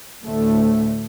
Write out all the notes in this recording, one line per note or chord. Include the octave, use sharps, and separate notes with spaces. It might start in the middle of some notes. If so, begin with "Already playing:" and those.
D2 A2 A3